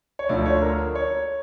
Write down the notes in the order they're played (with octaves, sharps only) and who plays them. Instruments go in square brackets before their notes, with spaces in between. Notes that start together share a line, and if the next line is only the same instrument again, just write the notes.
[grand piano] C#5
D2 D3 F3 D5
C#5
A#4
C#5